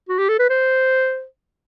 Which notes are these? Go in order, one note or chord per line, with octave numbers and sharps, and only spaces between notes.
F#4
G4
A4
B4
C5